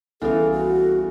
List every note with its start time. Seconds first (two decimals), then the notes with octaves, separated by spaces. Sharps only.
0.22 C2 E3 B3 C#4 G#4 A4 F5
0.52 F#4